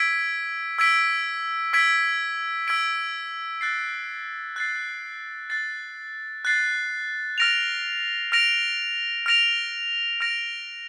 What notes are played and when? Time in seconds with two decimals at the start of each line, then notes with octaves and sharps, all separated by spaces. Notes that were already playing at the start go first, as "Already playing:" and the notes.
Already playing: E6 G#6 B6 D7
0.78 E6 G#6 B6 D7
1.73 E6 G#6 B6 D7
2.68 E6 G#6 B6 D7
3.61 F#6 A6 C7
4.56 F#6 A6 C7
5.50 F#6 A6 C7
6.45 F#6 A6 C7
7.38 F6 A#6 D7 F7
8.32 F6 A#6 D7 F7
9.26 F6 A#6 D7 F7
10.21 F6 A#6 D7 F7